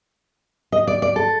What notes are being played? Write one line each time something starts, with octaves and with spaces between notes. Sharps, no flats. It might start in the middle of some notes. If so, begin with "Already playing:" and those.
D#5
D5
D5
A4